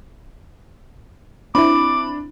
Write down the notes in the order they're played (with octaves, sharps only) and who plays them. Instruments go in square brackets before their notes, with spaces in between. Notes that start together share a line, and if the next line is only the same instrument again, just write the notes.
[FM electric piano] C4 E4 [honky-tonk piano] D4 [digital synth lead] B5 [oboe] D6